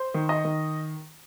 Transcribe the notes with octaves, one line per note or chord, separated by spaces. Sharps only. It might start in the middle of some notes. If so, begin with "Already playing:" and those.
Already playing: C5
D#3
D#5
D#3